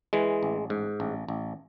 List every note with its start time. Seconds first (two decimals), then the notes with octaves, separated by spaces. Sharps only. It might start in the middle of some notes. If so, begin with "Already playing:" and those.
0.13 E3 G#3
0.43 A1
0.70 G#2
1.00 A1
1.28 A1